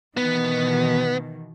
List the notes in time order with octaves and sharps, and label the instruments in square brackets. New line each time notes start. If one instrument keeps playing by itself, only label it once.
[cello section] B2 D#3 E3 [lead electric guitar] B3